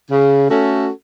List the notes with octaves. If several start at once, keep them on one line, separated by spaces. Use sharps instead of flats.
C#3
A3 C#4 F#4 A4